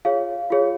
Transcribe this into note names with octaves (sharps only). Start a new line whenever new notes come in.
F4 G#4 C#5 F5
F4 G#4 C#5